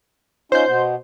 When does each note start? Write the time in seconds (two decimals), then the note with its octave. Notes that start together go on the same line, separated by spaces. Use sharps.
0.52 C#4 D#4 F4 C5 G6
0.67 B2 B3